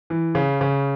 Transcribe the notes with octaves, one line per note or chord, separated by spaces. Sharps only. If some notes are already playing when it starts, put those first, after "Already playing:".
E3
C#3
C#3